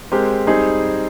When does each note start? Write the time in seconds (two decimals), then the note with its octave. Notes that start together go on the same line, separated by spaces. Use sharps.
0.12 G#3 C4 G4 A#4
0.47 G3 C4 D#4 G#4